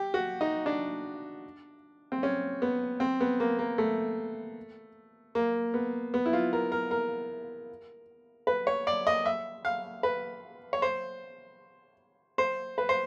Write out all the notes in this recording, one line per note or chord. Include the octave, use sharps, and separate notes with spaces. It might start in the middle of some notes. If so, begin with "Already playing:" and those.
Already playing: G4
F#4
D#4
D4
C4
C#4
B3
C4
B3
A#3
A#3
A3
A#3
B3
B3
E4
F4
A#4
A#4
A#4
B4
C#5
D5
D#5
E5
F5
B4
C#5
C5
C5
B4
C5